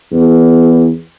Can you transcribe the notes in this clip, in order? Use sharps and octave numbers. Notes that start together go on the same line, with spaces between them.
E2